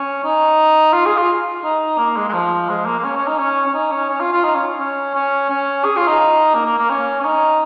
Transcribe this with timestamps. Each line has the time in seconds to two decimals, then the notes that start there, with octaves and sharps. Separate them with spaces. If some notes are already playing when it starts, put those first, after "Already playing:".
Already playing: C#4
0.24 D#4
0.93 F4
1.06 G#4
1.17 F4
1.64 D#4
1.98 A#3
2.17 G#3
2.29 G#3
2.34 F3
2.70 G#3
2.86 A#3
2.99 A#3
3.04 C#4
3.16 C#4
3.28 D#4
3.39 C#4
3.66 C#4
3.74 D#4
3.92 C#4
4.10 C#4
4.21 F4
4.32 F4
4.44 D#4
4.55 C#4
4.79 C#4
5.15 C#4
5.50 C#4
5.85 G#4
5.97 F4
6.08 D#4
6.55 A#3
6.66 A#3
6.78 A#3
6.90 C#4
7.21 C#4
7.25 D#4